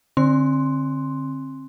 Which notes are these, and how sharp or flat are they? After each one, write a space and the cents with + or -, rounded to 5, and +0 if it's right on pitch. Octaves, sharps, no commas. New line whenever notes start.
D3 +0 C4 +25 C6 +0